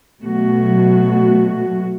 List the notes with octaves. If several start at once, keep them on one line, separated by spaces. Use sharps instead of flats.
B2 F#3 A3 F#4